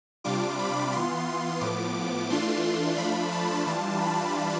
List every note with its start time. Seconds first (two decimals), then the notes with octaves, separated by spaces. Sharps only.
0.24 C3 G3 D4 F4 D6
0.59 B5
0.93 E3 B3 F4 C6
1.61 A2 F3 B3 D6
2.30 E3 A3 D4 F4 C6
2.98 F3 A3 D4 F4 B5
3.32 A5
3.67 E3 G3 D4 F4
4.01 B5